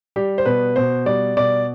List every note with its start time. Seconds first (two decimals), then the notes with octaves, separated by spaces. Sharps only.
0.16 G3 G4
0.38 C5
0.46 B2 B4
0.76 B2 C5
1.06 G3 D5
1.37 B2 D5